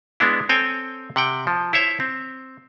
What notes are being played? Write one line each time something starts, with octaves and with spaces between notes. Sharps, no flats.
G#3 B3 D4 E4
C4 A4 C#5 G5 G#5
C3 F#5 G5
F3
E4 C5 C#5 E5
C4